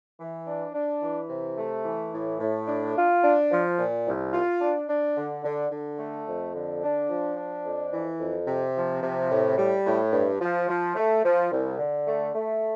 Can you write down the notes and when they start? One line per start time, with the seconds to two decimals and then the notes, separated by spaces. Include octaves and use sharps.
0.19 E3
0.47 D4
0.74 D4
1.01 E3
1.29 C3
1.57 A3
1.85 E3
2.13 A2
2.40 A2
2.67 D4
2.95 F4
3.23 D4
3.51 F3
3.79 A#2
4.05 C2
4.33 F4
4.60 D4
4.88 D4
5.16 D3
5.44 D3
5.71 D3
5.98 A3
6.26 F2
6.54 D3
6.82 D4
7.09 F3
7.37 D4
7.65 F2
7.92 E3
8.19 F2
8.47 C3
8.75 F3
9.03 C3
9.30 A2
9.58 G3
9.85 A2
10.12 G2
10.41 F3
10.68 F3
10.96 A3
11.24 F3
11.51 C2
11.78 D3
12.07 A3
12.34 A3